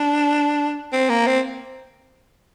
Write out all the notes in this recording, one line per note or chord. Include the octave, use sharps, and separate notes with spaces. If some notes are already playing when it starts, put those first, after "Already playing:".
Already playing: D4
C4
A#3
C4